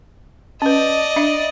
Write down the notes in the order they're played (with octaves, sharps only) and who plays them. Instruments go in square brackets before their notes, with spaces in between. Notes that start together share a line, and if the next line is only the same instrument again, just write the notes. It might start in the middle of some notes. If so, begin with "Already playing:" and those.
[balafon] C#4 B4 [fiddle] D5 D#5
[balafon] D4 E5